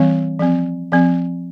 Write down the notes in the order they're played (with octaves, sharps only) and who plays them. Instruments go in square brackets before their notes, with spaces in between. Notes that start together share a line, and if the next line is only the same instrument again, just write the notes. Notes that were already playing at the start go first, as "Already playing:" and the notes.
Already playing: [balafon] E3 G3 C4
F3 C4
F3 C4